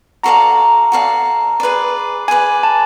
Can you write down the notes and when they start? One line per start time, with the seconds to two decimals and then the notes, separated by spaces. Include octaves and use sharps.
0.23 F#4 A4 D5 F5 A#5
0.58 A#5
0.92 F#4 A4 D5 F5
1.60 G#4 B4 D5
2.28 G#4 B4 D5 G#5
2.63 A5